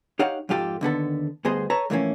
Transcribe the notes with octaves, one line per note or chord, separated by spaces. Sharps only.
D#4 G4 C#5 F5 F#5
F2 G#2 F4 G4 A4
D#2 D3 B3 A4
D2 G2 B3 G#4 C5 D#5
A4 B4 C#5 A5 A#5
F2 A2 E3 A3 A#3 C#4